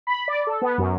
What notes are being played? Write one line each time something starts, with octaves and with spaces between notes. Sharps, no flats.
B5
D5
A4
B3
F#2